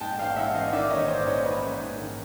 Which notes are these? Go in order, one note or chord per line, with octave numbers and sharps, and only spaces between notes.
G#2 G5 A5
A1 F5 G5
G#2 E5 F#5
A1 D#5 F5
D#3 D5 E5
G#2 C#5 D#5
D#5
A1 C5 D5
G#2 C#5 D#5
A1 B4 C#5
A1
G#2
D#3